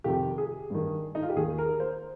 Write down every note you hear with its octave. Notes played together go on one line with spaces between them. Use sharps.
F2 C3 D#3 G4
G#4
G2 D#3
D#4
F4
G4
D#2 D#3 G#4
A#4
C5